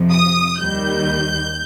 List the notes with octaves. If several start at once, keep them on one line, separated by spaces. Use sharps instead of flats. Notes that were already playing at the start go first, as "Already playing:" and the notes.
Already playing: F2 C3 F3
D#6
D#2 D#3 G3 G6